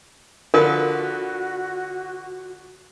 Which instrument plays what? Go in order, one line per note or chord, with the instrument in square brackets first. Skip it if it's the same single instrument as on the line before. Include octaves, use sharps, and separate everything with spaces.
[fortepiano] D3 F3 B4 [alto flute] F#4 [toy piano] A#4